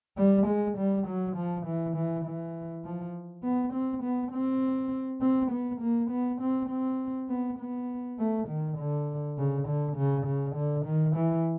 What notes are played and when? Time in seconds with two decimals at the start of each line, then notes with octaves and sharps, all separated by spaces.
0.17 G3
0.46 G#3
0.77 G3
1.07 F#3
1.36 F3
1.66 E3
1.96 E3
2.25 E3
2.84 F3
3.43 B3
3.73 C4
4.03 B3
4.32 C4
5.21 C4
5.51 B3
5.81 A#3
6.10 B3
6.41 C4
6.70 C4
7.29 B3
7.59 B3
8.18 A3
8.48 D#3
8.78 D3
9.37 C#3
9.67 D3
9.97 C#3
10.26 C#3
10.55 D3
10.85 D#3
11.15 E3